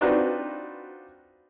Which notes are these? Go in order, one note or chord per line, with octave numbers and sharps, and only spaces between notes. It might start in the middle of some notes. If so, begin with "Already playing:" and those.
C4 D4 D#4 F4 F#4 B4